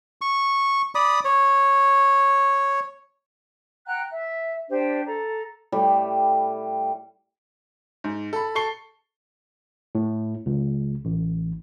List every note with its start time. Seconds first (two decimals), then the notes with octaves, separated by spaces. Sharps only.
0.21 C#6
0.95 D5 B5 D#6
1.25 C#5
3.86 F#5 G5 A#5 F#6
4.10 E5
4.69 D4 G4 C5
5.06 A4 A#5
5.72 A2 G3 G4 B5
8.04 G#2
8.33 A4 B5
8.55 A4 C#6 C7 G7
9.95 A2
10.46 C#2
11.05 A1